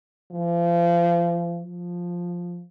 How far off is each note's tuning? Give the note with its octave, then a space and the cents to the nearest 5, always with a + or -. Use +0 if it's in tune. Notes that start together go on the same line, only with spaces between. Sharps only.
F3 -30
F3 +5